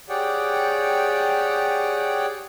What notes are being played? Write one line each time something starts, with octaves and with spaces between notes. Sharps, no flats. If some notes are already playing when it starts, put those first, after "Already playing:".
G4 G#4 C#5 D5 F#5 G5